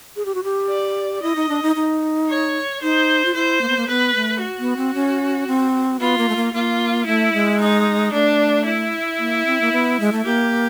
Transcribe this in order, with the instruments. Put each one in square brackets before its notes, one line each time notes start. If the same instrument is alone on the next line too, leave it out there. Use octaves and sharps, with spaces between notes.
[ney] G#4
G4
F#4
G4
[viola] D5
[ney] E4 [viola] D#5
[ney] D#4
D4
D#4
D#4
[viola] C#5
[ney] D#4 [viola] C5
[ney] F4
[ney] E4 [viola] C5
[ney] A#3
B3
A#3
[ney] B3 [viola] B4
[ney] A3
[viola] F#4
[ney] B3
C4
C#4
C4
[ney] B3 [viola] F4
[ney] A#3
A3
A#3
[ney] A#3 [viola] F4
[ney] A3 [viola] E4
[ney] G#3
[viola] D#4
[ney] A3 [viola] D4
[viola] E4
[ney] A#3
C4
A#3
B3
G#3
A3
[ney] A#3 [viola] G4